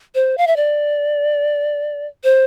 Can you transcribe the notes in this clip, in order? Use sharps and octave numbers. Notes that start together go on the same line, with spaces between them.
C5
F5
E5
D5
C5